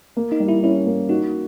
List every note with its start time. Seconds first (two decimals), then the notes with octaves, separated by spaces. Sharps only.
0.17 A#3
0.32 D#4
0.40 G3
0.48 E4
0.63 C#4 E4
0.86 A#3
1.09 D#4 F#4